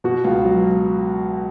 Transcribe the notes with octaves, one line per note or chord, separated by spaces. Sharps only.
B2 F#4
C#2 F4
F#3